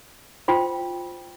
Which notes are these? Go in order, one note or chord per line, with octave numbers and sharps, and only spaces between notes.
F4 C5 G5 C6